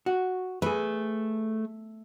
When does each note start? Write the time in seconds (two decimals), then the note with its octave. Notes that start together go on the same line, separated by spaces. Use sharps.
0.06 F#4
0.62 A3 G#4 B4